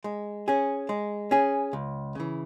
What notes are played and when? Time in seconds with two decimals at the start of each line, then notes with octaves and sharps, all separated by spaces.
0.04 G#3
0.48 C#4 G#4
0.89 G#3
1.31 C#4 G#4
1.73 C#2
2.15 C#3 E3